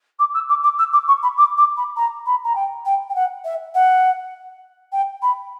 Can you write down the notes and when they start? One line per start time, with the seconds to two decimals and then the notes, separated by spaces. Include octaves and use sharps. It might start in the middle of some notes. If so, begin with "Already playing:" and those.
0.19 D6
0.34 E6
0.49 D6
0.63 D6
0.78 E6
0.92 D6
1.07 C#6
1.22 B5
1.37 D6
1.57 D6
1.76 B5
1.96 A#5
2.26 B5
2.44 A#5
2.55 G5
2.85 G5
3.09 G5
3.15 F#5
3.44 E5
3.74 F#5
4.92 G5
5.22 B5